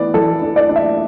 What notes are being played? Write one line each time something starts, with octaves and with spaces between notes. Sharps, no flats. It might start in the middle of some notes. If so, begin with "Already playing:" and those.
Already playing: E3 B3 D5
E3 A4
D4
D5
D4
E5